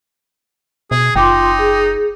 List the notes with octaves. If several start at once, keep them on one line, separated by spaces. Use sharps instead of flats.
B2 G#4
F#1 D#4 F4 G5 C6 D6
G#4